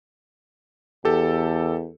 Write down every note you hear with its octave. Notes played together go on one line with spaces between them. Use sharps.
E2 G4 A4